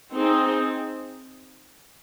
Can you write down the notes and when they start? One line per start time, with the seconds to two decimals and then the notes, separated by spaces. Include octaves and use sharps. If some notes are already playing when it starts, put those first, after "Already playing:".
0.13 C4 D#4 G#4